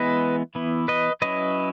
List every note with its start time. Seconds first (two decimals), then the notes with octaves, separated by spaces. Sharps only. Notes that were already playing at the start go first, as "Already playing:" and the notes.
Already playing: E3 G#3 B3 E4 B4 D#5
0.55 E3 B3 E4
0.88 B4 D#5
1.22 F#3 C#4 E4 B4 D#5